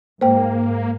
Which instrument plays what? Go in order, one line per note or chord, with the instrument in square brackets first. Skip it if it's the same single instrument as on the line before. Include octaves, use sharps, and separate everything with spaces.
[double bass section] G#2 [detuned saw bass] A#3 [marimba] C5 G5